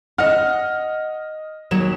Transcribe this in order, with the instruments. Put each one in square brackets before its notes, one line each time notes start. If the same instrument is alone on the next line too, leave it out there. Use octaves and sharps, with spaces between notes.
[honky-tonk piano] D#5 F6 [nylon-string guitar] F#5
[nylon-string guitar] D#2 F#3 [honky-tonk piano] E7